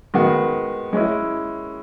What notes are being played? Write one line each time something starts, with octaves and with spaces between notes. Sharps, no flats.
D#3 G#3 B3 F#4
G#3 C#4 E4